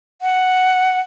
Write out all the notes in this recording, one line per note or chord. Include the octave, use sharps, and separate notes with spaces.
F#5